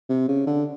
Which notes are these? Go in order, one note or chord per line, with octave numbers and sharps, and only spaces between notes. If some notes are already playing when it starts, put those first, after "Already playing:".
C3
C#3
D3